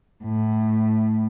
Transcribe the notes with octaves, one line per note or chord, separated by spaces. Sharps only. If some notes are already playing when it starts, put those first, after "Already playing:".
A2